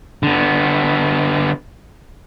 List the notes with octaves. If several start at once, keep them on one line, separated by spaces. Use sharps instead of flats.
D3 B3